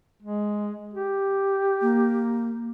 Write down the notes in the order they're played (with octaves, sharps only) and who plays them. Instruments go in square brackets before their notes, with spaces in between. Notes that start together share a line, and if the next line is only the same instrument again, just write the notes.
[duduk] G#3
G4
[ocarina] A#3